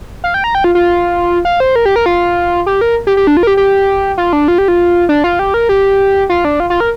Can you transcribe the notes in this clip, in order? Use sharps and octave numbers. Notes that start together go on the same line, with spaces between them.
F5
G5
A#5
G5
F4
F4
F5
C5
A#4
G4
A#4
F4
G4
A#4
G4
G4
D4
F4
A#4
G4
G4
F4
D4
F4
G4
F4
D4
F4
G4
A#4
G4
F4
D4
F4
F4
A#4